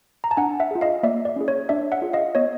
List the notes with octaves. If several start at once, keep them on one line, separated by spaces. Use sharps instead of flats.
A#5
A5
D4 F#5 G#5
E5 F#5
F4 G#4
D#5 F5
A#3 D5 E5
D5
C#4 E4 G#4
C#5
D4 D5 E5
E5 F#5
F4 G#4
D#5 F5
B3 C#5 D#5